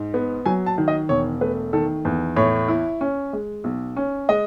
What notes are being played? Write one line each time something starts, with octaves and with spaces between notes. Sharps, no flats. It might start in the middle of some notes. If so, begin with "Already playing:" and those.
Already playing: G#2
B3
F#3 G#5
A5
D#3
D#5
E1 C#5
A3 B4
D#3 A4
E2
A2 C#5
E4
C#4
G#3
B1
C#4
G#3 D#5